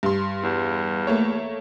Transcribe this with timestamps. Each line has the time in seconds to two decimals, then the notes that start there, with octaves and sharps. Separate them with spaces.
0.03 G2 C6
0.43 E2
1.07 A3 A#3 C#5